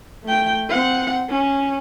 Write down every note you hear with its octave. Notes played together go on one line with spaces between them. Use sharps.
A3 G5
C4 F#5
C#4